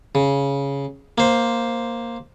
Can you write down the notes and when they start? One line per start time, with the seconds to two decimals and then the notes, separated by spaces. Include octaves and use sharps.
0.15 C#3
1.18 A#3 C5